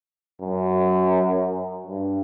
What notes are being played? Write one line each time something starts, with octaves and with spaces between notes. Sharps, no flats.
F#2
G2